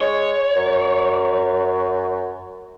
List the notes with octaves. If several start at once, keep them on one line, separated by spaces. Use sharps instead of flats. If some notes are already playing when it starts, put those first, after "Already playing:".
G#3 C#5
F#2